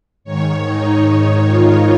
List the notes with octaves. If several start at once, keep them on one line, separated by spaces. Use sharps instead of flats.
G#2 D#3 C#5
D#4
F4